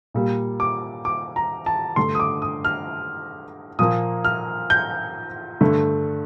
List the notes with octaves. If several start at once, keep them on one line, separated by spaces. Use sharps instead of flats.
A#2 G3 A#3
D6
D6
A#5
A5
G2 D3 A3 C6
D#6
D6
D#6
F6
A#2 F3 A#3 D#6
F6
G6
G2 D3 A3